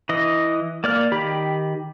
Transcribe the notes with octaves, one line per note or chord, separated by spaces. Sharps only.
E3 D#5
A#3 D5 F6
D#3 G4 B5